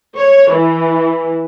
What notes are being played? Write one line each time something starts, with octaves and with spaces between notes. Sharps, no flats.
C#5
E3